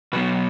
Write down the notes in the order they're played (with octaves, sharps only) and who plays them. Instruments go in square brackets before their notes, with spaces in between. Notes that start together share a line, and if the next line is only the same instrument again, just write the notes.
[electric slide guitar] B2 F#3 B3 B4